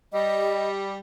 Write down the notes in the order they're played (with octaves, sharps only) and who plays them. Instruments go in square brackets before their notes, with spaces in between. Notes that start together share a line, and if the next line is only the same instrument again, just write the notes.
[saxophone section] G3 [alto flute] D#5